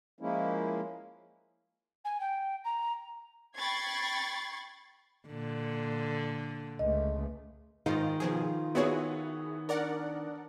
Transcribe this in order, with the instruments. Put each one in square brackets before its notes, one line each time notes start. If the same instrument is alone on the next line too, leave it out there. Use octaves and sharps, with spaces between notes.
[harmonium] F3 G#3 A#3 C#4 E4
[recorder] G#5
G5
A#5
[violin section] G5 B5 C#6 G#6 A6 C7
[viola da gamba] A#2 D3
[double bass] C#2 A3 [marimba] D#5
[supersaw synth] G#2 D#4 F4 [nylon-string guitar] D#3
[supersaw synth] B2 F3 G#4 [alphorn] F4
[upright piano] B3 C#5 [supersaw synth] E4 F#4 G#4
[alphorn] D4 [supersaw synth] A#4 D5 F#5